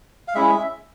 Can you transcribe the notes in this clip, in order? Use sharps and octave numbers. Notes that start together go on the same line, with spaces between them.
F5
G#3 C#4 E4 E5